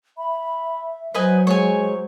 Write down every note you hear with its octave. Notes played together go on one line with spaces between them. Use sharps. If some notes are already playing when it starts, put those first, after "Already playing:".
E5 B5
F#3 B4 C5 D#5 G#5
G#3 C5 C#5 G#5